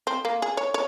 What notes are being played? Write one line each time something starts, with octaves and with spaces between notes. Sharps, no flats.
C4
A#3
G#4
C#5
C#5